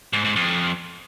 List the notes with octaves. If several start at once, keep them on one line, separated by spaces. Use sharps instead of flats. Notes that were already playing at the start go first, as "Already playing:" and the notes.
G#2
G#2
F2